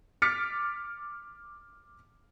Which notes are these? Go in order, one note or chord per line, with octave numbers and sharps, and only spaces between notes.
D6 F6 A6 B6 C#7